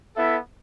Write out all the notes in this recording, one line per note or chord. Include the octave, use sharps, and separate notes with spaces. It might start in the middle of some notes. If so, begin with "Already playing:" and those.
B3 E4 A4 E5